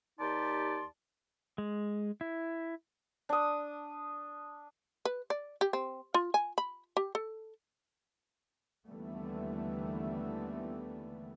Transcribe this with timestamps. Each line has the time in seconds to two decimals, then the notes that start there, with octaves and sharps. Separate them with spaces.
0.20 D#2 D#4 G4 D5 A5 C6
1.58 G#3
2.21 E4
3.29 D4 D#6
5.05 B4
5.30 D5
5.61 G4
5.73 C4
6.14 F4
6.34 G#5
6.58 B5
6.97 G4
7.15 A4
8.86 D#2 D3 E3 G3 A3 B3